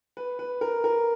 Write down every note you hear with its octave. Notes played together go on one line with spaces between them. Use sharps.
B4
B4
A#4
A#4